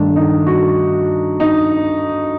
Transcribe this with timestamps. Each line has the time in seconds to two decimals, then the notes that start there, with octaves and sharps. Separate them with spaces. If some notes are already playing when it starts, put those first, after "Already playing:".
Already playing: G2 D#3 A3 D4
0.16 D#4
0.46 F#4
1.40 D#4